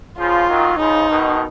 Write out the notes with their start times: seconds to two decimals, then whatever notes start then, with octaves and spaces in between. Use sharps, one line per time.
0.18 C#3 F3 F4
0.49 D#3 F#3
0.79 C#3 F3 D#4
1.10 B2 D#3